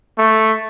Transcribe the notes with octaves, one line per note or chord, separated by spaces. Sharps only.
A3